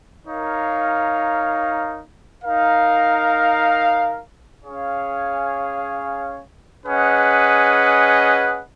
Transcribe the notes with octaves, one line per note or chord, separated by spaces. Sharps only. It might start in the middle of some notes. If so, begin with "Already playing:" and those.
D#4 A#4 C#5 F5
D#4 A#4 F5
C#4 G#4 C#5 F5
C#4 G#4 B4 D#5 F#5